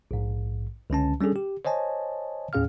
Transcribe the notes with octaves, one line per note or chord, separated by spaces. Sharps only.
A#1 G#2
C#2 D3 C#4 A5
G3 C#4 D4 G#4 A4
G4
C5 C#5 D#5 G#5 A5
D#2 A2 C#4 G#4 F5 F6